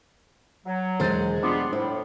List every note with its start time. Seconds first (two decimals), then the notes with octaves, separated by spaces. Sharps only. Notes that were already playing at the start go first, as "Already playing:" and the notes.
0.66 F#3
1.00 E1 G#3 G#4 C5 A6
1.43 G3 B3 D4 F4 D6
1.73 A2 E4 C5